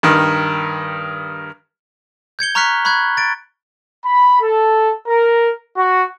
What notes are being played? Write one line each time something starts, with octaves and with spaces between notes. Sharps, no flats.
G2 D#3
G6 G#6 C#7 G7
A#5 C#6 F6 F#6 B6 C#7
B5 C#6 F#6 G#6
A6 D7
B5
A4
A#4
F#4